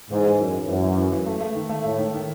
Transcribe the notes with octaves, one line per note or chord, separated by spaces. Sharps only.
G#2 E3
E3
F#2 E3
E3
F#2 E3
E3
E3
E3
A3
A3
D#3
A3
A2 E4
D#3
D#3